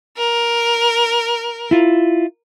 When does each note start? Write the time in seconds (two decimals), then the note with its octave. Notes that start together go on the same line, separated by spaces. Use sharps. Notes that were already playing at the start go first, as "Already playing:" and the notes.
0.18 A#4
1.71 E4 F4